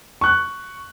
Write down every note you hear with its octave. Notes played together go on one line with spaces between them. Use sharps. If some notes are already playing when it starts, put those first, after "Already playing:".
C#6 F#6